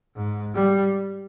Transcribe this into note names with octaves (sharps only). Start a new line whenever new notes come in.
G#2
G3